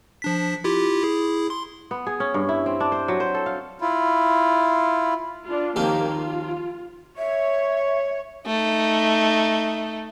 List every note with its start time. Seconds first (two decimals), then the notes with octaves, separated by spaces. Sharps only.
0.22 F3 D4 B6
0.64 E4 F4 G4
1.03 E4 G#4
1.50 C6
1.91 B3
2.07 G#4
2.20 C#4
2.34 G2
2.49 E4
2.66 C4
2.80 D4
2.92 C5
3.08 F#3
3.20 C5
3.35 A4
3.46 F5
3.81 E4 F4
5.45 D4 F4
5.76 D#2 D#3 F3 A#3 C4 G4
6.11 F4
7.18 C#5 E5
8.46 A3 D#4